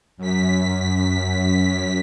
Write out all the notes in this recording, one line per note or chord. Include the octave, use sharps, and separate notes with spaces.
F#2 B6